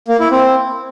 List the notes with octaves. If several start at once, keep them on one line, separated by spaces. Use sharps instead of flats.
A#3
E4
C4